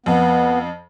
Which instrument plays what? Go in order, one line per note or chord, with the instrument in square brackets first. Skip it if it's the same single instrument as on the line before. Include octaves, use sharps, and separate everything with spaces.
[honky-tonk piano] F2 [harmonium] B3